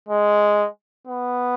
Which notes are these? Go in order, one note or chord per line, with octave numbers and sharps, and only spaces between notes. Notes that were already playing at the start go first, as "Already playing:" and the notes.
G#3
B3